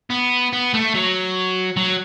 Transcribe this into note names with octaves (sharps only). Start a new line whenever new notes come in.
B3
B3
A3
F#3
F#3